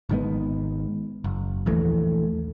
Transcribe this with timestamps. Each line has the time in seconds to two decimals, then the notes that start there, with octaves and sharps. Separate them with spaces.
0.09 G#1 D#3 G#3 B3
1.24 F#1
1.66 A#1 D#2 E3 A3